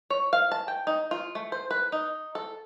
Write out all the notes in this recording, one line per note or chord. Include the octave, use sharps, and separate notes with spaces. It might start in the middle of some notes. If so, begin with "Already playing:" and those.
C#5
F5
A5
G5
D#4
F4
A3
C5
B4
D#4
A4